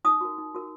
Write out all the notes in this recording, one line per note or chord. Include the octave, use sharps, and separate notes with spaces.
D#4 D#6
F#4 A#4
D#4
F#4 A#4